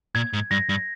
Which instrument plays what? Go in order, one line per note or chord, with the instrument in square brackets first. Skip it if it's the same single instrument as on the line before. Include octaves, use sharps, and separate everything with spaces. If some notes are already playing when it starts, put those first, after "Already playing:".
[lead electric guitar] A#2 [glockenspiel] G#6
[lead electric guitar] G#2
[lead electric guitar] G2 [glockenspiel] A#6
[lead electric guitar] G2